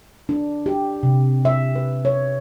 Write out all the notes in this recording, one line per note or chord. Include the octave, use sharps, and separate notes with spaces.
D4
G4
C3
E5
B4
C#5